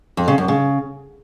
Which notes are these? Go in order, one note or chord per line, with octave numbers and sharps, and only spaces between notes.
F2
C#3
F#2
C#3